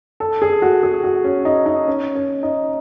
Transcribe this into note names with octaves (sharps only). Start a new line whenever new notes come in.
A4
G#4
F#4
G#4
F#4
C#4
D#4
D#4
C#4
C#4
D#4